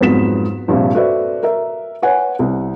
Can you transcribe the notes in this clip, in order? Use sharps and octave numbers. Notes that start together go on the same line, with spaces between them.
F2 G#2 F#3 B3 B6 E7
A#1 G2 C3
F#4 A4 B4 C5 D5 E5
A#4 E5
B4 C#5 F#5 G#5
C2